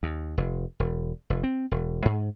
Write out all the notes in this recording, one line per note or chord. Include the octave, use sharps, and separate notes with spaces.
D#2
F1
E1
F1
C4
E1
G#2